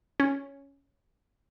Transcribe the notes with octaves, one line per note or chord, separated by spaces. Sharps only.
C#4